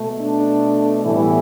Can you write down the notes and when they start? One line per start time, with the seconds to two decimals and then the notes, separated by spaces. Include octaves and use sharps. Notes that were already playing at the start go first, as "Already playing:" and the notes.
Already playing: B2 A3
0.20 D4
1.04 A2 E3 G3 B3 E4